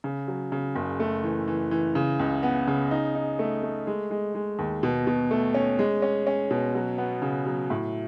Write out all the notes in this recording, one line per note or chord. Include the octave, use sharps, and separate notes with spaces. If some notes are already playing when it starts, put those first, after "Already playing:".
C#3
F#3
C#3
F#1
A3
E3
E3
E3
C#3
C#2
B3
C#3
D#4
D#4
A3
A3
G#3
G#3
G#3
D#2
B2
B2
A3
C#4
G#3
C#4
C#4
B2
F#3
B3
C#3
F#3
A2